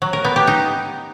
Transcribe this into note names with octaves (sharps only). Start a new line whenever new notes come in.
F#3
A#4
B3
G4
D#4